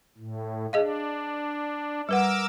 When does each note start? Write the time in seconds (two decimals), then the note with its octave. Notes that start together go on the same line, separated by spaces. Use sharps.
0.17 A2
0.73 D4 G#4 D#5 F5
2.09 G3 A#4 B4 F#5 D6 E6